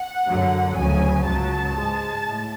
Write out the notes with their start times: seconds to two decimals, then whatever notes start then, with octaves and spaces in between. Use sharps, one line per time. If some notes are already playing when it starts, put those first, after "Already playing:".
Already playing: F#5
0.28 F#2 D3 F#3
0.77 D2 C#3 F#3 G#5
1.26 C#2 C#3 F#3 A5
1.75 G#2 G#3
2.25 A2